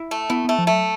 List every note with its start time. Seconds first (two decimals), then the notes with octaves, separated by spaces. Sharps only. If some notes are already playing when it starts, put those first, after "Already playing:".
Already playing: E4
0.11 A3
0.30 B3 E4
0.45 A3 B3
0.58 F3
0.67 F#3 A3